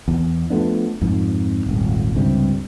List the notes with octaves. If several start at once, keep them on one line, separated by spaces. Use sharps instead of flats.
E2
F3 A3 B3 D4
F2 G#2
D#1 G#1
C#2 G2 C3 G3